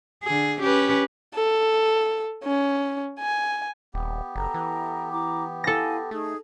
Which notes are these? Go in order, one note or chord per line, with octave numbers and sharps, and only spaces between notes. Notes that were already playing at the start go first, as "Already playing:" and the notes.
D3 G#4
C#4 G4 B4
A4
C#4
G#5
D#1 B3 G4
F#1 A4 A#5
E3
E4 A#5 D6
E4 A4 F5 G#5 A#6
A3 D#4 G#4